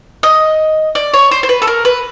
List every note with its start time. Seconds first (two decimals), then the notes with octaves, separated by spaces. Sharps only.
0.23 D#5
0.95 D5
1.14 C#5
1.31 C5
1.43 C5
1.49 B4
1.62 A4
1.67 A#4
1.85 B4